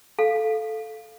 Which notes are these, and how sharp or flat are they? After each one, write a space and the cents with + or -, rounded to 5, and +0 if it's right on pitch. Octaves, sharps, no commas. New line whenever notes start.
A4 -10 F5 +0